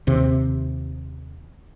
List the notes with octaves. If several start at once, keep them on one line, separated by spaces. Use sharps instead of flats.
D#2 C3